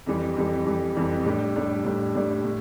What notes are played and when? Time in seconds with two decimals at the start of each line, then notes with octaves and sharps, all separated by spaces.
0.06 F2 E3 G3
0.37 F2 E3 G3
0.66 F2 E3 G3
0.96 F2 E3 G3
1.25 A2 G3 D4
1.56 A2 G3 D4
1.85 A2 G3 D4
2.15 A2 G3 D4
2.44 A2